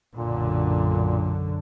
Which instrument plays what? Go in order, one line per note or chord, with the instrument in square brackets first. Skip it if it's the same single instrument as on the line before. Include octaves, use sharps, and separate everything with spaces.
[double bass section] B1 F#2 D3 [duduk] A#2